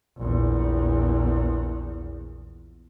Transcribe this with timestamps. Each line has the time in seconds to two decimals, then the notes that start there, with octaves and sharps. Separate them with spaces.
0.18 A#1 E2